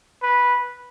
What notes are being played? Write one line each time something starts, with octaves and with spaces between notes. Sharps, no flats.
B4